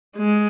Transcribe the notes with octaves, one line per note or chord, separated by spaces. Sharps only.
G#3